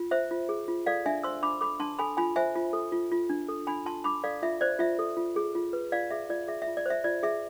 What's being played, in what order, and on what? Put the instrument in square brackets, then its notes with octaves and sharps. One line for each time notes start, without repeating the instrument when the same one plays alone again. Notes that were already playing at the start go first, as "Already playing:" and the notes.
Already playing: [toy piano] F4
C5 E5
F4
G#4
F4
A4 D5 F5
D4 E5 G#5
C5 C6 E6
D4 B5 D6
A4 B5 D6
D4 A5 C6
A4 G#5 B5
F4 G#5 B5
C5 E5 G#5
F4
A4
F4
F4
D4
A4
D4 G#5 B5
F4 A5 C6
D4 B5 D6
A4 D5 F5
F4 E5
C5 D5
F4 E5
A4
F4
G#4
F4
B4
F4 D5 F5
G#4 E5
F4 D5
G#4 E5
E5
F4
D5
C5 E5
F4 D5
G#4 E5